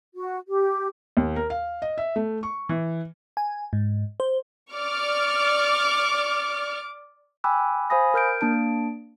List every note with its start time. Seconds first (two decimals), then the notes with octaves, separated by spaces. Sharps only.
0.15 F#4
0.47 G4
1.17 D#2
1.36 A#4
1.50 F5
1.82 D#5
1.98 E5
2.16 A3
2.43 C#6
2.69 E3
3.37 G#5
3.73 G#2
4.20 C5
4.73 D5 C#6 D6 F6
7.44 G5 G#5 B5 D6 E6 F#6
7.90 C5 F5 G#5 B5 D#6 A#6
8.14 A#4 F6 G6 D7
8.41 A#3 D4 A5 D7